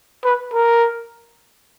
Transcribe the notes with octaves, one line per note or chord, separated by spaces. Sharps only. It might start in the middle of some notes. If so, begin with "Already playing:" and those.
B4
A#4